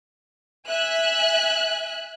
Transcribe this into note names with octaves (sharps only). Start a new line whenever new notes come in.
E5 G#5 F#6